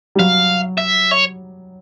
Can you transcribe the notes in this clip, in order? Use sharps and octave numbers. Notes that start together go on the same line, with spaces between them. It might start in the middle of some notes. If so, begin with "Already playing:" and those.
G3
F#3 F5
E5
C#5